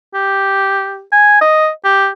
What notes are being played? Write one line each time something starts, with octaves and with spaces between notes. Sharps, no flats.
G4
G#5
D#5
G4